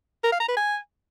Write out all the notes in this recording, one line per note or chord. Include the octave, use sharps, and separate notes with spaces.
A#4
F5
A#5
B4
G#5